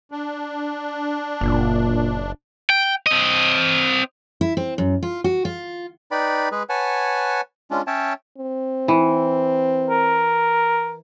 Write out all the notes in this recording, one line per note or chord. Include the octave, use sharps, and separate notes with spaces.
D4
F#1 A#2
G5
C4 D#5
E4
C4
F#2
F4
F#4
F4
D#4 B4 D5 G5 B5
G#3 G#4 B4
B4 C#5 F#5 G#5 A5
G#3 C#4 D4 F4
C#4 C#5 E5 G5 A5
C4
E3
A#4